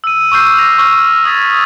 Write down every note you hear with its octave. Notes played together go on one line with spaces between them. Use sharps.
E6 D#7
C#6 D6 E6 F6 G6 C7
A#6 D#7 F7
C#6 E6 F6
D#6 E6 G#6 A6 B6 F7